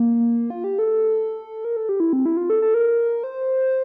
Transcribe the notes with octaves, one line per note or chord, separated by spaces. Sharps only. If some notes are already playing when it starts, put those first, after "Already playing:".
Already playing: A#3
F4
G4
A4
A#4
A4
G4
E4
C4
E4
F4
A4
A4
A#4
C5